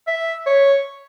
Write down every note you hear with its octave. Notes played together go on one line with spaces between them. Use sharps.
E5
C#5